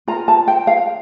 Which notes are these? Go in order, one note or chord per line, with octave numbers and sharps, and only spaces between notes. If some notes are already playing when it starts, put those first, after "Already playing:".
F4 A#4 A#5
A5
G5
F5